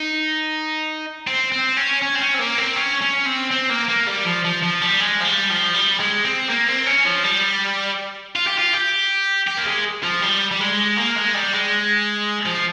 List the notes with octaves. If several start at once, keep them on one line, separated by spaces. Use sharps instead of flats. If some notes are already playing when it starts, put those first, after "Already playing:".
Already playing: D#4
C4
C4
C#4
C#4
C4
C#4
C4
A#3
C4
C#4
C#4
C4
C4
A#3
A#3
G3
F3
F3
F3
G3
G#3
F3
G3
F3
G3
G#3
C4
A#3
C4
C#4
F3
G3
F4
G4
F4
G4
G4
A#3
G#3
F3
G3
G3
G#3
A#3
G#3
G3
G#3
F3